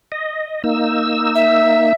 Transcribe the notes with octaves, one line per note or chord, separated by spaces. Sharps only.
D#5
A#3 D#4 E6
E5